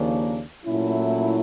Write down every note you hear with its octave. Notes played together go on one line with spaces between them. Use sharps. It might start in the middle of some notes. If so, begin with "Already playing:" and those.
Already playing: D#2 C#3 F3 A#3 D4
A#2 F#3 A3 C#4 E4